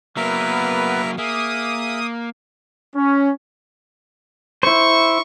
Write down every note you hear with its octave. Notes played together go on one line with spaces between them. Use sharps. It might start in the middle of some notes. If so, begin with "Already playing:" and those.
F#3 A#3 B3 A#4 B4 E5 A#5
A#3 G#4 E5 D#6
C#4
E4 C5 C#6